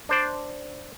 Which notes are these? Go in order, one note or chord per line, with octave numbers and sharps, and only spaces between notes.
D4 C5 D5